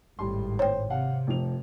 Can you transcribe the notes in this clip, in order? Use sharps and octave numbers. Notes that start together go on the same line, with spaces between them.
G#1 A2 G3 C6
C5 C#5 G5
C3 F5 F#5
F1 F3 F7